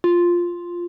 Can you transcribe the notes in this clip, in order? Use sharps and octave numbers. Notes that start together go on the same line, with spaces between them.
F4